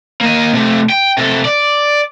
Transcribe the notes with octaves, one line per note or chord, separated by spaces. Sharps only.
A#3 D#5
C3 A3
G5
C3 A4
D5